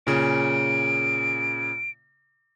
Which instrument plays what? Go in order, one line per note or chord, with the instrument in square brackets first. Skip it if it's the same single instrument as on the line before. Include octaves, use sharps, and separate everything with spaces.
[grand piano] A#2 C#3 [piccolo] D7